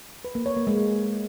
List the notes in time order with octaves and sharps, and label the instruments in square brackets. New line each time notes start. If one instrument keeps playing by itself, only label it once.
[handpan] B4
A#3
C#5
A#3
G#3